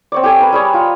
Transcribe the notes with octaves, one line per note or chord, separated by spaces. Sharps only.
C4 C#5 D5
G4 A4 G#5
A#4 B4
G3 G#4 C#5
F4